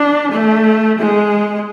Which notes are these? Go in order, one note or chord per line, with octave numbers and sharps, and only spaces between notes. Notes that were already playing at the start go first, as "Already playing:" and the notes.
Already playing: D4
A3
G#3